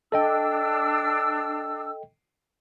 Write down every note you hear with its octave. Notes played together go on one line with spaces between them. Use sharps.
D4 A4 D#5 G5 E6